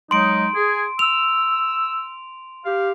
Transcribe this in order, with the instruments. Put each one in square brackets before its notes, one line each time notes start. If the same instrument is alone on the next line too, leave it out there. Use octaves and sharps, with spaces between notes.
[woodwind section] F#3 G#3 D#4 [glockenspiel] C6 D7
[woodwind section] G#4
[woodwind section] E6 [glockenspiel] F7
[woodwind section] G4 F5